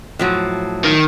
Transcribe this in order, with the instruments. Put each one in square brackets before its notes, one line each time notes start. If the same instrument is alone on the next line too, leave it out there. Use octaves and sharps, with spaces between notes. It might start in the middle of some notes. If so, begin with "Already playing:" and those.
[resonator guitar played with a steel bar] A2 F3 F#3
[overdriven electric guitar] D#3